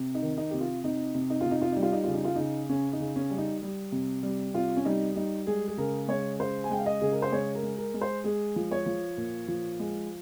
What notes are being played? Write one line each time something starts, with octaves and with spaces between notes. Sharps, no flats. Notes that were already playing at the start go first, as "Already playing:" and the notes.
Already playing: C3
D#4
D#3
D#4
C3 G4
F4
C3 D#4
C3
D#4
C3 F4
D#4
F4
G3 D#4
F4
D#4
C#3 F4
D#4
F4
C#3 D#4
C#3 C#4
D#4
C#3
C#4
G3
D#4
G3
C3
G3
C3 F4
C#4
G3 D#4
G3 D#4
G#3 G#4
G#4
C#3 A#4
G#3 C#5
C#3 C5
G#5
G#3 G5
F5
D#5
C#3 G#4
A#4
C5
G#3 C#5
A#4
G#3
A#4
G#3
C5
G#3 G#4
F3
C#5
F3
A#2
F3
G#3